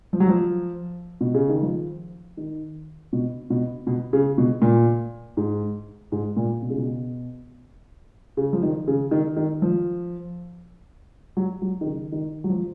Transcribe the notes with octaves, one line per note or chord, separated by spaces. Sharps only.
F3
F#3
F3
B2
C#3
D#3
F3
D#3
B2
B2
B2
C#3
B2
A#2
G#2
G#2
A#2
B2
C#3
B2
C#3
F3
D#3
C#3
D#3
D#3
F3
F#3
F#3
D#3
C#3
D#3
F#3
F3